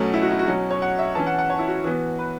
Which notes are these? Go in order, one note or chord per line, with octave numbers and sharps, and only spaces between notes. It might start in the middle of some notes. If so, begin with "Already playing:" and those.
Already playing: B2 F#3 A3 C#4
E4
F#4
E4
F#4
B2 F#3 C#4
C#5
F#5
E5
E3 C#4 A5
F#5
F#5
C#5
E4
F#4
E3 B3 F#4
B4